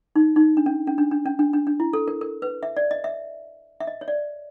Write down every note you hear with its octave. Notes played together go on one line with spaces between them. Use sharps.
D#4
D#4
D4
C#4
C#4
D4
D4
C#4
D4
D4
D4
E4
A4
A#4
A#4
B4
E5
D5
D#5
E5
E5
D#5
C#5
D5